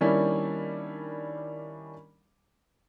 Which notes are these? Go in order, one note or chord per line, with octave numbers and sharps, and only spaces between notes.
D#3 G3 A#3 C#4 D4 E4